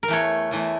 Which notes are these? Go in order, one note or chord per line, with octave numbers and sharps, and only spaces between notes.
A#4
E2 E3 A3 C#5
E2 E3 A3